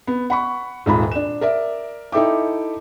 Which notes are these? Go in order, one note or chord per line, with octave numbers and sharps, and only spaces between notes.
B3
F#5 B5 C#6
D#1 G#2 F4 B5
D4 E7
A#4 D5 E5
D#4 E4 A4 E5 G5 D6